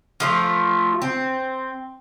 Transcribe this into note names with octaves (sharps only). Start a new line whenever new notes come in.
F3 A3 F4
C4